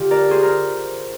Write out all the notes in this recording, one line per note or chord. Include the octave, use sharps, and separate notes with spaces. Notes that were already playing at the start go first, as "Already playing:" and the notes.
Already playing: D3 F4 G4
A#4 D5
G#4 C5
A#4